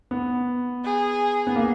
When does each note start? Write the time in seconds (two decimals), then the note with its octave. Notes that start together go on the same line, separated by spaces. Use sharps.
0.11 B3
0.84 G#4
1.47 B3
1.56 A#3